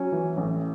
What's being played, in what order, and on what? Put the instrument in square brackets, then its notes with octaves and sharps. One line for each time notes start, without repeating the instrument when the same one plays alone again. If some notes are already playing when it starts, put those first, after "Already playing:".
Already playing: [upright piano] F#3 [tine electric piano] C#4
[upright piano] E3
A1